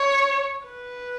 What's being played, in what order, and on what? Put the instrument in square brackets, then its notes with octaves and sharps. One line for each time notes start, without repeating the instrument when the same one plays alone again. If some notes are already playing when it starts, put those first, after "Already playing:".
Already playing: [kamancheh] C#5
B4